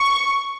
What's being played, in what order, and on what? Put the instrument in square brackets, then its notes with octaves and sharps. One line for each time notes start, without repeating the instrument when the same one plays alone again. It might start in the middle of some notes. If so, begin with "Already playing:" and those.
Already playing: [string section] C#6